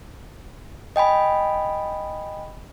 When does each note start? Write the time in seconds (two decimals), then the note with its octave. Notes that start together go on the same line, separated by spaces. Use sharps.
0.96 D#5 G5 G#5 B5